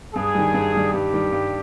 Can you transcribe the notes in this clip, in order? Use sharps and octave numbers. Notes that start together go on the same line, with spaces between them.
G2 G#4
D#3 G3
G2
D#3 G3
G2 G4
D#3 G3
G2